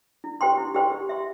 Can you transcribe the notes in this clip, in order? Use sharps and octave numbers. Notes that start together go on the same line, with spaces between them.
E4
G4 C5 G5 C6
E4
G4 C5 G5 C6
G4
E5 C6